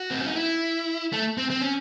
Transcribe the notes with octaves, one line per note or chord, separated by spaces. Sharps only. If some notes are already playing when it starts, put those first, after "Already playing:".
Already playing: F#4
C4
C#4
D#4
E4
A3
C4
C4
C#4